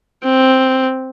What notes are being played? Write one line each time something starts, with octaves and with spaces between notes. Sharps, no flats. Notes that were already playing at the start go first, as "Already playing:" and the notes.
C4